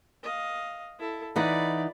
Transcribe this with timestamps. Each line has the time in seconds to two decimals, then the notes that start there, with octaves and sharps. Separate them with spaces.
0.23 D#5 F5
1.00 E4 A4
1.36 E3 D#4 D5 F#5 B5